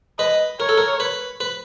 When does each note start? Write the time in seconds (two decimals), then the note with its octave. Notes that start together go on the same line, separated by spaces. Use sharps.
0.19 B4 D#5
0.59 A#4 C#5
0.69 A4
0.78 A#4
1.00 B4
1.40 B4